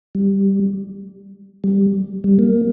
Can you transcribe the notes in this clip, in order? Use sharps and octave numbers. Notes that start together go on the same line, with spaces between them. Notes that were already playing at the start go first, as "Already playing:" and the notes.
G3
G3
G3
A#3